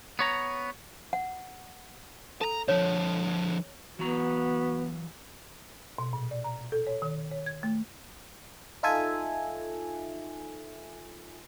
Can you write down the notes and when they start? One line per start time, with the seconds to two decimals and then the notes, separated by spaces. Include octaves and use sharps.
0.19 B3 C#5 A#5
1.13 F#5
2.41 A4 A5 A#5
2.68 D3 F3 C#5
3.99 E3 F#3 B3 F#4 A#5
5.98 B2
6.13 A#2
6.31 D5
6.44 A#5
6.72 A4
6.87 C#5
7.02 D#3
7.31 C#5
7.46 G#6
7.63 A3
8.83 D#4 F4 A4 E5 G#5